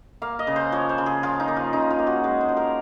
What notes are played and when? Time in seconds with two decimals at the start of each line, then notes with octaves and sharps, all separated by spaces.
0.22 A#3 F5
0.39 D#5
0.47 C#3
0.56 C5
0.72 F3 C#5
0.89 C5
0.98 C#3
1.06 G#4
1.23 F3 F4
1.40 D#4
1.48 A#3
1.57 F4
1.73 C#3 D#4
1.90 F4
1.99 A#3
2.07 F#4
2.24 G#3 G#4
2.41 C5
2.49 F3
2.57 A#4